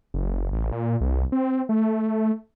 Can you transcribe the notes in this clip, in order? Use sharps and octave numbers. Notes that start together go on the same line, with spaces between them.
F#1
A1
A#2
C2
C4
A3